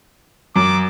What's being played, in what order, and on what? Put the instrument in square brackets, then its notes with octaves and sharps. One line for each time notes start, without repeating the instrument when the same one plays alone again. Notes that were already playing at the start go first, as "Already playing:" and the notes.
[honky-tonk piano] F#2 [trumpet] D6